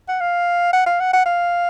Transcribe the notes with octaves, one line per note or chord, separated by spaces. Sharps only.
F#5
F5
F#5
F5
F#5
F#5
F5